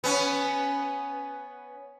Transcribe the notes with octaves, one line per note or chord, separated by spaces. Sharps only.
B3 C#4